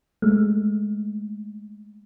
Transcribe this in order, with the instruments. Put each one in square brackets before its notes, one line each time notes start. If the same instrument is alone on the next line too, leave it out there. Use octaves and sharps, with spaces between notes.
[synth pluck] G#3 A3